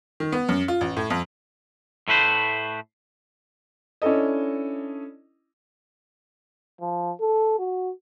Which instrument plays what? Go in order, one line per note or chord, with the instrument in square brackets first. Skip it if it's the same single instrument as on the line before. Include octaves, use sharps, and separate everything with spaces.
[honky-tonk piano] D#3
B3
F#2
F4
A1
A2
F2
[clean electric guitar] A2 A3 B4 C5
[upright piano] C#4 D4 E4 A4 D#5
[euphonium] F3
A4
F#4